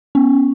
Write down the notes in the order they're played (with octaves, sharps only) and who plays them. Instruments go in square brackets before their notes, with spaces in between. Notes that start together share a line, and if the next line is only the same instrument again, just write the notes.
[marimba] B3 [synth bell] C#4